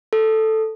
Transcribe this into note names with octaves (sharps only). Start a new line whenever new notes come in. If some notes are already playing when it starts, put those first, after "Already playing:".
A4